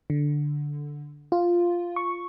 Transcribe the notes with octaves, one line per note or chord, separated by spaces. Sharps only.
D3
F4
C#6